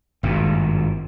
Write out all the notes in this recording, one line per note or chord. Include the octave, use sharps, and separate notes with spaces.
G#1 G2 A#2